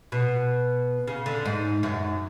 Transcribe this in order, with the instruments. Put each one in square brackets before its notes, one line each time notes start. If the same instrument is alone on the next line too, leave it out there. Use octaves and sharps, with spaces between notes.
[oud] B2
C#3
D3
G#2
F#2